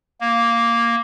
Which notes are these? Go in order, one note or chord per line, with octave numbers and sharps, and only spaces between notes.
A#3